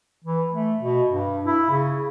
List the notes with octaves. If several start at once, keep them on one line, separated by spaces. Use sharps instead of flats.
E3
A3
B2
G2
E4
C#3